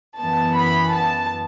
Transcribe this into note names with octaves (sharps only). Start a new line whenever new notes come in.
F#2 E3 B3 A5
B5
A5